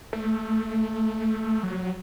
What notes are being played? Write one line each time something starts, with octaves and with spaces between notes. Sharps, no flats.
A3
F#3